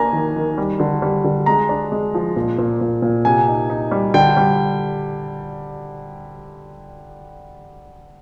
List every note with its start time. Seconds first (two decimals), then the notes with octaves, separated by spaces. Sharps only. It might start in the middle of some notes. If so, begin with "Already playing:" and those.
Already playing: A#3 D4 G#5 A#5
0.13 D#3
0.36 D#3
0.58 G3
0.80 D3
1.02 G3
1.24 D3
1.46 G#3 A#5
1.69 D4
1.92 G#3
2.14 F3
2.36 A#2
2.58 A#2
2.81 A#2
3.02 A#2
3.25 C3 G#5
3.48 D#4
3.70 D#4
3.91 G3
4.14 D3 G5
4.37 G3